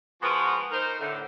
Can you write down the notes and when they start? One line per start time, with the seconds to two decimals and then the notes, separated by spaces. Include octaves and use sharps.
0.22 F3 G#3 B3 F#4 A#4 B4
0.71 D#4 A#4 C5
1.00 A2 D3